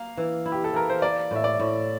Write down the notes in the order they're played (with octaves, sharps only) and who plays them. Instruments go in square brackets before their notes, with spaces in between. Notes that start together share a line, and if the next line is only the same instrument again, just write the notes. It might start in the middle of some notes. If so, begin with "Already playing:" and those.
Already playing: [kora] A#3 [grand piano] F5
[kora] E3
E4
[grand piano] G4
A4
[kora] E3 [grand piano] A#4
[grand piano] C5
[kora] A#3 [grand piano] D5
[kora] A2 [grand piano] E5
[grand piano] D5
[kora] A2